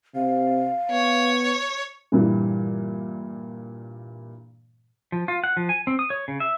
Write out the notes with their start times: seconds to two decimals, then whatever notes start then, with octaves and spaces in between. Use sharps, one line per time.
0.15 C3 F5
0.91 B3 C#5
2.12 G2 A#2 E3
5.12 F3
5.28 F4
5.44 F#5
5.57 F3
5.69 G#5
5.87 C4
5.99 D#6
6.10 C#5
6.28 C#3
6.40 E5